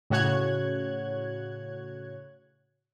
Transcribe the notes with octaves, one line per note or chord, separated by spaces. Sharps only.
A2 C#3 F#4 C#5 F#6 G#6